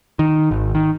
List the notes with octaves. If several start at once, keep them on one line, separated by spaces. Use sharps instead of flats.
D#3
G#1
D#3